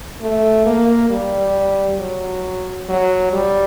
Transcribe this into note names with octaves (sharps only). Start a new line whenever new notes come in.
A3
A#3
G3
F#3
F#3
G3